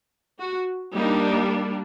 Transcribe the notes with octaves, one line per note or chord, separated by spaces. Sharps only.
F#4
G3 A#3 D4 D#4